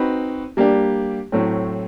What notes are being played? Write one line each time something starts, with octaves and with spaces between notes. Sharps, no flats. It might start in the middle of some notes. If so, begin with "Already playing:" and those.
Already playing: C4 D#4 F#4 B4
G3 A#3 D4 G4
A2 F#3 A3 C4